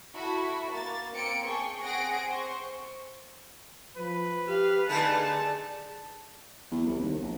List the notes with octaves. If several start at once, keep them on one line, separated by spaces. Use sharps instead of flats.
E4 F#4 A4 B5
A#3 A6
A#3 C4 C#7 D7
G#4 G5 A5 C#6
C4 G#4 F#5 A#6 D7
C5 C#6
F3 B4
G4 F5
D3 A3 D#4 G#4 A5
E2
C2
D#2
A#1